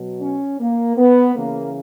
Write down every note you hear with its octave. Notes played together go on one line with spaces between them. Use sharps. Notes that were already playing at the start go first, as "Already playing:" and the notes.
Already playing: B2 F#3
C#4
A#3
B3
C#3 E3 A#3